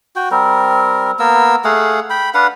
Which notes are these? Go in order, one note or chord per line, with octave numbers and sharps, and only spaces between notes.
F#4 G5
G3 C4 A#4
A#3 B3 A#4 E6
A3 G#4 F5 F#5
G5 B5
D4 B4 F5 F#5